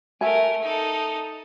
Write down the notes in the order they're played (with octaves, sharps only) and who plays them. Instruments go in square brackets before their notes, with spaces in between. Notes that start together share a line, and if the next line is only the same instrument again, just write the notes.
[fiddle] A3 A#4 [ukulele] E5 G#5
[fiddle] D#4 A4